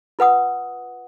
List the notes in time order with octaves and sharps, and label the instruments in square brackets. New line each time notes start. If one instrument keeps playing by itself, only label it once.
[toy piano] F4 B4 F#5 D#6